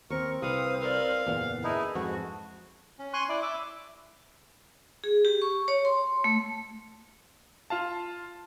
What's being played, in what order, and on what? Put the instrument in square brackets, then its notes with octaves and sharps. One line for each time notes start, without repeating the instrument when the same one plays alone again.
[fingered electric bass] D#2 [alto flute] C4 [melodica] A#4 C#6
[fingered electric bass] C2 [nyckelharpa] B4 [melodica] F5 D#6
[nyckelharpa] A#4 D5 [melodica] F5
[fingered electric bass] F#1 E2 A#2 [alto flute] F#5
[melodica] D#4 E4 [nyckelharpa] G#4 B4 [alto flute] A5
[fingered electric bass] F2 G#2 [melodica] F#4 [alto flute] A5
[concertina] C#4
G#5 C6 C#6 F#6
E4 D5
E5 D6
[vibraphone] G#4
G4
C#6
C#5
C6
A3
[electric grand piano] F4 F5 A5